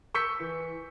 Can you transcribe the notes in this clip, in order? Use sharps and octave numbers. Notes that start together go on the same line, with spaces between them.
C#6 E6 G6 B6 C#7
E3